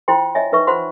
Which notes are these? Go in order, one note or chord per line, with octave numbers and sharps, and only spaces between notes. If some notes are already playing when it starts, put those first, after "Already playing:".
E4 F4 C5 G5 C6
C#5 D#5 E5 G#5
D#4 B4 E5 C#6
F4 C5 F#5 C6